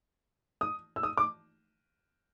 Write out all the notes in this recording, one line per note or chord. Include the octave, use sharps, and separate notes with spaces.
D#6
E6
D#6
D6